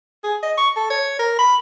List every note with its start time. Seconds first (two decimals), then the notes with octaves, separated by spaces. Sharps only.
0.24 G#4
0.43 D#5
0.58 C#6
0.76 A4
0.90 C#5
1.19 A#4
1.39 B5